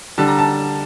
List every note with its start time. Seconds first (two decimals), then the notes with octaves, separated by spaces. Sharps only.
0.18 D3 G3 A5
0.28 A#5
0.39 A5